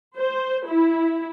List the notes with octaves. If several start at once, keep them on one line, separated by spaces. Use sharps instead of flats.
C5
E4